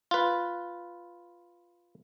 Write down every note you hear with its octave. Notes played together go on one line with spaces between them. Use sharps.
F4 B4